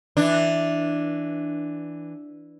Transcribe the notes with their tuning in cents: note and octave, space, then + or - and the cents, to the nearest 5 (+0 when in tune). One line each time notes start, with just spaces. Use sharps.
E3 +0 D4 +0